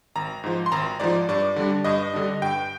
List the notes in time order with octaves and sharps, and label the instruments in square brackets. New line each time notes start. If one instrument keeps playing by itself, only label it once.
[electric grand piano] G#1 A#5
G#2 F3
C6
G#1 A#5
G#2 F3 D5
G2 D5
D3 G3 D4
G2 D#5
D3 G3 D4
G2 G5